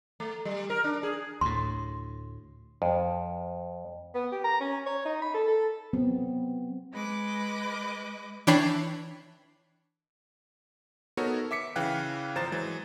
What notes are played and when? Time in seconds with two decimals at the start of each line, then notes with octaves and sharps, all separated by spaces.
0.20 A3
0.45 G3
0.70 A#4
0.84 D4
1.03 G#4
1.41 D2 A2 C6
2.82 F2
4.15 B3
4.32 G4
4.44 A#5
4.60 C#4
4.86 C#5
5.05 D#4
5.22 B5
5.34 A4
5.48 A4
5.93 F#3 B3 C4
6.93 G#3 B4 D#5 D6
8.47 E3 D4 C#5 G5 B5 C7
11.17 B3 D#4 F#4 A4 A#4 C#5
11.51 E5 D6 B6 C#7
11.76 C#3 E3 F5 G5 F#6
12.35 G#1 F3 C5 A#5 A6 E7
12.51 E3 F#3 G#3